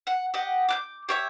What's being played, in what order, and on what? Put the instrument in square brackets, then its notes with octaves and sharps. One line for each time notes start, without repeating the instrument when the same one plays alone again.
[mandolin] F#5
G4 D#5 F#5
D6 F#6 G6
G4 C#5 E5